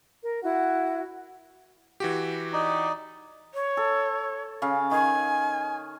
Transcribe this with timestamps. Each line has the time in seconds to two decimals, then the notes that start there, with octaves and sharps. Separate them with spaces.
0.21 A#4
0.43 E4 F#4 F#5
2.00 E3 F#4 G4
2.53 D#4 D5
3.54 C#5
3.77 A4
4.62 C#3 F5
4.91 D#3 G#5